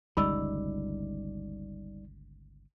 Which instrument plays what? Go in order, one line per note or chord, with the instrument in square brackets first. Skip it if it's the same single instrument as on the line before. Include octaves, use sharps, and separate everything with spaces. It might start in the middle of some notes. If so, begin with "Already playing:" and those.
[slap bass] G1 C#2 D#3 [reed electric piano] G3 D#4 D5 [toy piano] B5 E6